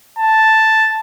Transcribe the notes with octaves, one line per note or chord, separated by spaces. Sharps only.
A5